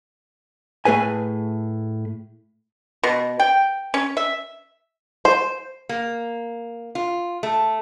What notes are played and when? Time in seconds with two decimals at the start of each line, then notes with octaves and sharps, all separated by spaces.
0.85 A2 A3 G#4 B4 G#5
3.03 B2
3.40 G5
3.94 C#4
4.17 E5
5.25 C5
5.89 A#3
6.95 F4
7.43 A3